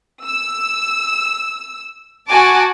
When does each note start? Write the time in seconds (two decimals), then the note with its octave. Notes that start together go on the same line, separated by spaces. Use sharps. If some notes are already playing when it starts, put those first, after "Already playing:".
0.24 E6
2.28 F#4 G#5 A5 D6